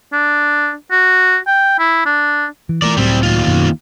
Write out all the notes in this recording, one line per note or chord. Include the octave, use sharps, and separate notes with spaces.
D4
F#4
G5
E4
D4
E3
E3 A3 A#4 D5
C#2 A2 F#3 G3 C4
D#2 F4
F#2 B2 D#3